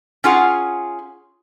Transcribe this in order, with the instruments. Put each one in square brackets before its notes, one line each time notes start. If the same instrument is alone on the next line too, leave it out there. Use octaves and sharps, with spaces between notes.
[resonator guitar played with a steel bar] C#4 F4 G#4 F#5